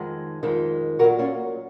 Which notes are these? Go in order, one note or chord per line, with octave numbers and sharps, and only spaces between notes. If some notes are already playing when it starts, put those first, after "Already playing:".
Already playing: F2 D#3 G#3
F2 D#3 G#3
A#2 F#4 A#4
F#3
C#4 F4